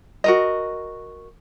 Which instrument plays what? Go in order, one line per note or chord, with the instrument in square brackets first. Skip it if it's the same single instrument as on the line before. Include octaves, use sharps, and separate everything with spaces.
[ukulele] F#4 A#4 D#5